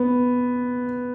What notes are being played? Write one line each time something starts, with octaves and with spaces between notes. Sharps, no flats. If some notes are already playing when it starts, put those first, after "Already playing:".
Already playing: B3